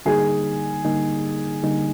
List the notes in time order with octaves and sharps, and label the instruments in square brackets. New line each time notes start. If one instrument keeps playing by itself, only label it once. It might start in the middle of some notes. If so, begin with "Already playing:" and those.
[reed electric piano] D3 G3 A#3 D#4 [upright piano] G#4
[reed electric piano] D3 G3 A#3 D#4
D3 G3 A#3 D#4